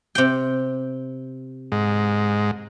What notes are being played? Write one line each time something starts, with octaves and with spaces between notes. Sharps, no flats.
C3 G5
G#2